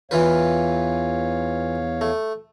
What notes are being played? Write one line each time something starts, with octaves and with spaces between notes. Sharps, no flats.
E2 E3 F4 B4 C#5 F5
A3